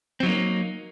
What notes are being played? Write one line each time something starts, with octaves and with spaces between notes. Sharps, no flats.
F#3 A#3 C4 D#4